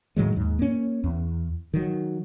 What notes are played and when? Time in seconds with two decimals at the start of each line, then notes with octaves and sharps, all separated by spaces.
0.17 A2 D#3 F#3 G#3
0.36 D#2 G#2
0.59 A#3 C#4
1.04 E2
1.74 D#3 F#3